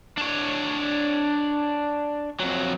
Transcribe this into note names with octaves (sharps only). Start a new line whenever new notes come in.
D4 C#5
F2 F#3